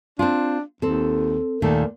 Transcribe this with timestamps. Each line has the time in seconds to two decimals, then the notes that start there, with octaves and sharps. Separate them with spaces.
0.19 C4 D4 F4
0.82 D#2 C4 A4
1.62 D#2 A#2 D#3 A3